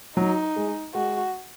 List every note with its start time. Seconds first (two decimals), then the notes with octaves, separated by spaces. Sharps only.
0.17 F#3 D#4
0.56 G#3
0.94 G#3 F#4